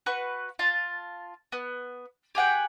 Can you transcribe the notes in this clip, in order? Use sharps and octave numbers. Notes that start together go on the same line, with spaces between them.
F#4 B4 C#6
F4 A5
B3
G4 G#4 F#5 G5